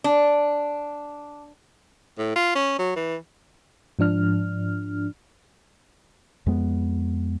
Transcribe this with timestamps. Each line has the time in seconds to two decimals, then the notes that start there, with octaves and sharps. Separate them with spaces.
0.04 D4
2.18 A2
2.36 F4
2.55 C#4
2.79 F#3
2.96 E3
3.99 G#2 F3 D4 F6
6.46 F2 G#3 B3